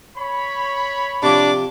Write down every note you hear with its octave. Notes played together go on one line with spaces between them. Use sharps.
C#5 B5
C3 F3 D4 D6